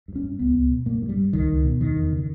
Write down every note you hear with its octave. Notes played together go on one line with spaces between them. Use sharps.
G2
C#4
G2
C#2 B3
C#2
B2
G2 A#3
G2
G3
G2
C#2 D#3
C#2
B2
E2 D#3
E2
C#3
D#3